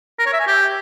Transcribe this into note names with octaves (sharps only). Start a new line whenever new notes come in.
A#4
C#5
E5
G#5
G4